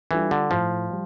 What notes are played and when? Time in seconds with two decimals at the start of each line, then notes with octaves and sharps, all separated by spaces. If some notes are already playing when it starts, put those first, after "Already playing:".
0.11 E3 G3 D4 F4 A4
0.31 D3
0.51 A2 F3
0.90 G3